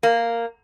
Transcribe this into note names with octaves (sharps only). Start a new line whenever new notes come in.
A#3